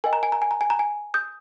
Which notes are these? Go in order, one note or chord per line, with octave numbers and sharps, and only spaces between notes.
A#4 D#5 G5 G#5
A#5
G#5
A#5
G#5
A#5
G#5
A#5
G#5
D#6 G6